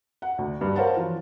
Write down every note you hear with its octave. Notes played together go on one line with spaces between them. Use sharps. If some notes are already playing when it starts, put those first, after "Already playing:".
F#5
D2
G2
A#4 C5 C#5 F5 F#5 A5
E3 F3 F4